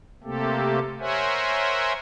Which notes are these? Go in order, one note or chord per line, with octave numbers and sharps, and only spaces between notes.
C3 A3 A#3 C4 G4 A4
A#4 C5 C#5 E5 F#5 G#5